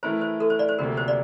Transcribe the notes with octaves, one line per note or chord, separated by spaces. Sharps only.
E3 A3 E4 A#4 C5
C5
A4
C5
D5
C5
D2 C3 F3 A#3 A#4
C5
D5